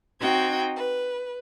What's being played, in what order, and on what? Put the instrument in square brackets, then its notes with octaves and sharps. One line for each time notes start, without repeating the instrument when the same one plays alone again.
[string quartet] C4 D#4 F#4 G5 G#6
B4